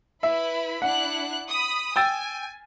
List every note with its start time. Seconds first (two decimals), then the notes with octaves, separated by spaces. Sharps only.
0.23 E4 B4 E5 B5
0.82 D4 E4 F#5 F#6
1.49 B5 D#6
1.96 G5 G#5 E6 A6